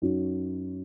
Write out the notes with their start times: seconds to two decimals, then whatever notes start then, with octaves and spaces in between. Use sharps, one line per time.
0.02 F#2 F#3 D#4 F#4